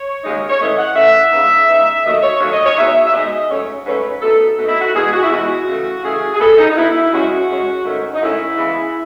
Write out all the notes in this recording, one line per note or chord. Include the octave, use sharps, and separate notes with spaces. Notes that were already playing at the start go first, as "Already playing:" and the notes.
Already playing: C#5
D#2 C#3 G#3 D#4
C#5
C#3 E3 A3 D#5
F#5
C#3 E3 A3 E5
C#3 G#3 B3 D#4
C#3 G#3 B3 D#4
D#2 D#3 F#3 A3 D#5
C#5
D#2 D#3 F#3 A3 C#5
D#5
C#5
B2 G#3 D#4 E5
E5
B2 G#3 D#4 D#5
G#2 F#3 A3 C#4 C#5
G#2 F#3 A3 C#4 B4
B2 A3 D#4 A4
A4
B2 A3 D#4
E4
F#4
E2 B2 G#3 G#4
F#4
E4
E2 B2 G#3 F#4
C#3 E3 A3
C#3 E3 A3 G#4
G#4
B2 G#3 B3 A4
D#4
D#4
B2 G#3 B3 E4
F#2 C#3 G#3 C#4 F#4
F#2 C#3 G#3 C#4
G#2 D#3 A3 C#4
D#4
G#2 D#3 A3 C#4 E4
C#3 E3 G#3 B3